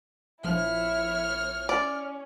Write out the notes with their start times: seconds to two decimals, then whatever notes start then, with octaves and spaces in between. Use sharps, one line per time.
0.44 A#1 F3 E4 C#5 F6
1.69 C#4 D5